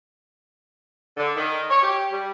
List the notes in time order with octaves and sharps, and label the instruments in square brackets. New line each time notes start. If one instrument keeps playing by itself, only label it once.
[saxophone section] D3
D#3
C#5
G4
G3